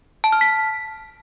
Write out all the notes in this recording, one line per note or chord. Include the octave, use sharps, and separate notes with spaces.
A5
F6
B6